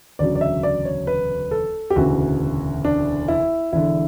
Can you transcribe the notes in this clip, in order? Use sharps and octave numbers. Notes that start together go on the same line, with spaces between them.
E1 D2 C#3 F#3 D5
D5
E5
D5
C#5
B4
A4
G4
E1 D2 C#3 E3 F#4
D4
E4
E1 E2 D3 E4